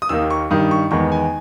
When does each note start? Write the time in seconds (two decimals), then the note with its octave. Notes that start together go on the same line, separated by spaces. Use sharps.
0.02 D#6
0.09 D#2 D#3 A#3 E6
0.30 C#6
0.50 G2 D#3 G3 D#6
0.71 C#6
0.91 E2 D#3 G#3 B3 C#6
1.12 G#5